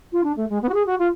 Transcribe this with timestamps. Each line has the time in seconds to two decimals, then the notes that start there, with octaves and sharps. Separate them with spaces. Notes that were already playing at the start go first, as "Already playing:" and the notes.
0.12 F4
0.24 D4
0.36 A3
0.49 G#3
0.62 B3
0.69 F#4
0.74 G#4
0.86 F#4
0.99 F4